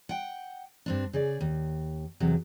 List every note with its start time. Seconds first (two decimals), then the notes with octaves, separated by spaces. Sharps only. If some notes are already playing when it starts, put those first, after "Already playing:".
0.09 F#5 G5
0.86 G2 C4 D4
1.13 C#3 G#4 D5
1.41 D#2
2.20 E2 C3 F#3